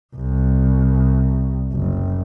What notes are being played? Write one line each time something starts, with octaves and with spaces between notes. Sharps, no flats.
C2
F#1